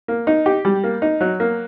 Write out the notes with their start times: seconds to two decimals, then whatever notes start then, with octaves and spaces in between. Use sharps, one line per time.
0.08 A#3
0.27 D#4
0.46 G4
0.65 G3
0.84 A#3
1.02 D#4
1.21 F#3
1.40 A#3